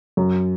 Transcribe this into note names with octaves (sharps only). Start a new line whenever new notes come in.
F#2